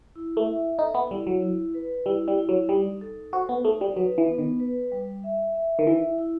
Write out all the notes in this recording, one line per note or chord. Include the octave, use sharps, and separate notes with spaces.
E4
A3
E5
D#4 A4
B3
G3 E4
F#3
E4
B4
G3 E4
G3
E4
F#3
G3 D#4
A4
F#4 C5
B3
A3 D#4
G3
F#3 B4
E3
B3
D#3
B4
G3
E5
E5
D#3
E3 E4
E4